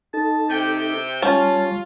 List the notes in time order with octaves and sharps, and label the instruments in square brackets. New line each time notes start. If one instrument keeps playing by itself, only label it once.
[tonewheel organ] D#4 A4 [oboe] A5
[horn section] C3 G5 [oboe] G4
[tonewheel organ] G3 [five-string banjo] C#4 [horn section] F4 [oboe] A5